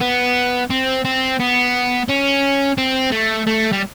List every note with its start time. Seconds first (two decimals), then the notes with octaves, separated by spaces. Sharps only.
0.01 B3
0.70 C4
1.05 C4
1.40 B3
2.09 C#4
2.78 C4
3.12 A3
3.47 A3
3.72 G3